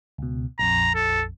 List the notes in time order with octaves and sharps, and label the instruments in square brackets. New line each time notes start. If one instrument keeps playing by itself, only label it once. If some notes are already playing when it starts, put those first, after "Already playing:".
[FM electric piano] C#2 B2
[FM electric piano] A#1 F2 [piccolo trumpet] A#5
[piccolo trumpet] A4